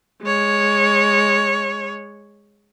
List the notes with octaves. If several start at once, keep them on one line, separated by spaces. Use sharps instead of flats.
G#3 C#5